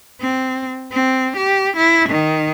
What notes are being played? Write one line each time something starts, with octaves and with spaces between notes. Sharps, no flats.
C4
C4
G4
E4
D#3